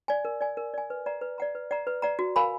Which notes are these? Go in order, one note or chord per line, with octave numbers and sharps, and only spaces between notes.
D5 G#5
A#4
D5 G#5
A#4
D5 G#5
B4
D5 F#5 A#5
B4
D5 F#5 A#5
B4
D5 F#5 A#5
B4
D5 F#5 A#5
F#4
A#4 F5 G#5 B5